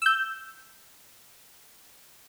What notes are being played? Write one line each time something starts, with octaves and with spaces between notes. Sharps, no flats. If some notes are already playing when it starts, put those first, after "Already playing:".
E6 G6